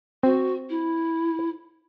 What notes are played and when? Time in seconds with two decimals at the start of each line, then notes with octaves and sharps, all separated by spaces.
0.23 C4 F#4
0.69 E4